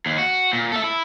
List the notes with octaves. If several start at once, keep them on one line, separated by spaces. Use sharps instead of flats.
D#2
F#4
A#2
A4 E5
E4